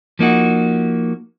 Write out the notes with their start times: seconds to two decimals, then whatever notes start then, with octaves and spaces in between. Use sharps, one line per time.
0.19 F3 A#3 D#4 F#4